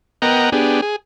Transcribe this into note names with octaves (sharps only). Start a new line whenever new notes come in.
B3 A#4 D#5 F#5 G5 A#5
B3 D4 G4 G#4
G#4